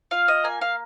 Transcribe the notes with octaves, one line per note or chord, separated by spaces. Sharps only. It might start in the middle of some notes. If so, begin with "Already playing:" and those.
F4 F5
D#5
A#3 G#5
F5